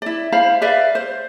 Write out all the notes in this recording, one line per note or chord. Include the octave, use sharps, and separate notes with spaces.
E4 D5
E4 C5 F5 B5
B4 D5 E5 F5
C5